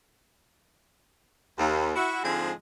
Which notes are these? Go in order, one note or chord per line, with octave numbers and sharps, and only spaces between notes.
D#2
E4 F#4
G#2 D3 F3 G#3 C4 G#4